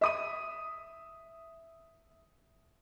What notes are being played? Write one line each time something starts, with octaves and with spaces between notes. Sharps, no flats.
E5 D#6 D#7